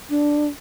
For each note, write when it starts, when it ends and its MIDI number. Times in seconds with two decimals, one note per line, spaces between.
0.10 0.47 62